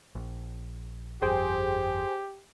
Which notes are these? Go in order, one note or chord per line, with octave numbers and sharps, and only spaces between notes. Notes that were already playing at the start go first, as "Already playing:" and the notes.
A#1
G1 F2 G4 G#4 C5 G5